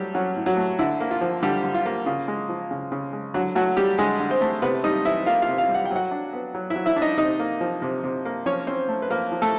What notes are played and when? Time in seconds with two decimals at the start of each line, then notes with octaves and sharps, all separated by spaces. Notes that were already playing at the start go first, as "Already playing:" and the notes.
Already playing: F#3 G3 A3 G4
0.14 F#3 C#4 F#4
0.36 A2
0.46 F#3 F#4
0.57 A3
0.79 D3 E4
1.00 A#3
1.11 F4
1.21 F3
1.43 D3 G3 G4
1.64 D3
1.75 F4
1.86 A#3
2.06 C#3 F4
2.28 G#3
2.49 F3
2.71 C#3
2.92 C#3
3.13 G#3
3.34 D3 F#3 F#4
3.55 F#3 A3 F#4
3.77 F#3 G3 G4
3.98 D3 G#3 G#4
4.20 D3
4.30 C4 C5
4.41 A3
4.62 C3 B3 B4
4.84 G3 D#4 D#5
5.05 E3 E4 E5
5.26 A#3 F4 F5
5.42 F4 F5
5.48 C3
5.58 F4 F5
5.69 G3
5.75 F#5
5.85 G5
5.91 F#3
5.96 F#4 F#5
6.11 D4
6.33 B3
6.55 F#3
6.70 E4 E5
6.76 F#3
6.86 E4 E5
6.96 D4
7.02 D#4 D#5
7.18 C3 D#4 D#5
7.39 A#3
7.61 F3
7.82 C3
8.04 C3
8.25 A#3
8.46 F3 C#4 C#5
8.67 C4 C#4 C5
8.89 A3
9.02 B4
9.10 F3 A#3 A#4
9.32 F3
9.42 A3 A4